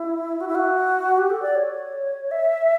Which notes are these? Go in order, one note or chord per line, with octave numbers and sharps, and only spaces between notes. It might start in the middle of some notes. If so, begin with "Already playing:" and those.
Already playing: E4
F#4
E4
F#4
G4
A4
D5
C#5
E5